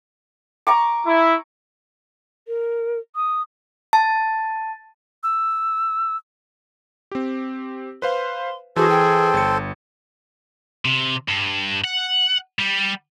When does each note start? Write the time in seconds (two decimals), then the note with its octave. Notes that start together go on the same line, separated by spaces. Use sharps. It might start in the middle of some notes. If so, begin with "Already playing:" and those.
0.67 A#5 C#6 D6
1.06 E4
2.48 A#4
3.16 D#6
3.93 A5
5.23 E6
7.12 C4 G4
8.02 B4 C5 F5 C6
8.76 E3 F#4 G#4 A4 C5
8.89 G5
9.34 G1 C#7
10.85 C3
11.28 G2
11.84 F#5
12.59 G3